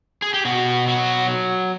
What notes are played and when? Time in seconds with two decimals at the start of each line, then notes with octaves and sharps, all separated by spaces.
0.22 G#4
0.34 G4
0.45 B2 F#4
0.87 F#3 F#4